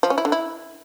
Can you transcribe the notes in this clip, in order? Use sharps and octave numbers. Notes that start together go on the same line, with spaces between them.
F3
C#4
E4
D3
E4